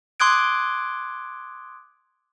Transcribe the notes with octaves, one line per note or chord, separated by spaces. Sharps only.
C6 D6 D#6 F#6 G#6 D7